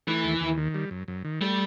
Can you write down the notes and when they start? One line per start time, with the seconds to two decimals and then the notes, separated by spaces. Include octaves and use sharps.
0.07 E3 A3
0.24 D#2
0.41 D#2
0.57 D#3
0.74 G3
0.91 F#2
1.08 F#2
1.25 D#3
1.41 G3 A3